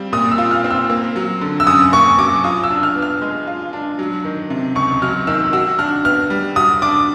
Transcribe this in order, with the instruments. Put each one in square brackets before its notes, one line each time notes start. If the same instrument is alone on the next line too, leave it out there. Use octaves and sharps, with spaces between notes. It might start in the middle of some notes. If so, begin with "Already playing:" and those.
Already playing: [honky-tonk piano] G3 C4 F4
[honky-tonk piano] A#2 [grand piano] D#6
[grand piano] E6
[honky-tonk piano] F4
[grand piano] F6
[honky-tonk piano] C4
[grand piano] E6
[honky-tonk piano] A#3
F#3
D3
[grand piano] E6
[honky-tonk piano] F#2 [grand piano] D#6
[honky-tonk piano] A#3 [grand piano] C#6
[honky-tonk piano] F#3 [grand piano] D6
[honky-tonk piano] F4 [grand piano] D#6
[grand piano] E6
[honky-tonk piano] D4
[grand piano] F6
[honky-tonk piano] B3
[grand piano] F6
[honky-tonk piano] G#3
F4
D4
F#3
D#3
C3
[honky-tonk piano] C#2 [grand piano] C#6
[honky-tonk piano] F#3 [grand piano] F6
[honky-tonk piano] D#3 [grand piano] E6
[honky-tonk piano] F#4 [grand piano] E6
[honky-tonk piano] D4 [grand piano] F6
[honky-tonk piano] B3 [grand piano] F6
[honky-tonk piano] G3
[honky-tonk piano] F#4 [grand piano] D#6
[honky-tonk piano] D4 [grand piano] D6